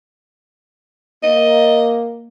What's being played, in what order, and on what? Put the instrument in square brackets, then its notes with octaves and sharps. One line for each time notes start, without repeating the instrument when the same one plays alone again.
[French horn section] A#3 [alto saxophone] D#5